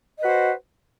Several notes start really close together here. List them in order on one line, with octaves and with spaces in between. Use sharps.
D#5 B4 F#4 C5